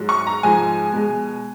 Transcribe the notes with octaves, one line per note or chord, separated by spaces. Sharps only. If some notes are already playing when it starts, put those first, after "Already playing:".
Already playing: G#2 F#3
C#6
A#5
G#2 F3 G#3 G#5
B2 G#3